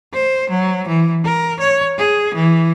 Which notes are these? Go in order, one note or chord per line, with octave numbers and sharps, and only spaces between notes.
C5
F#3
E3
A#4
C#5
G#4
E3